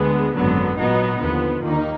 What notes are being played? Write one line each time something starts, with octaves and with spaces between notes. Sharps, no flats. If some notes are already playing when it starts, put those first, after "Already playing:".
Already playing: D2 D3 G#3 B3
G#1 F#2 D3 F#3 B3
A#2 F#3 B3 D#4
D#2 D3 F3 B3
D#2 D#3 A#3 D#4